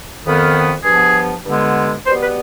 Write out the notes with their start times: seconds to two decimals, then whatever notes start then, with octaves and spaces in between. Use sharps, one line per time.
0.24 F2 D#3 B3
0.84 G2 F3 B3 G#4
1.45 G2 D3 G#3 B3
2.06 B2 G3 B3 C5
2.21 B4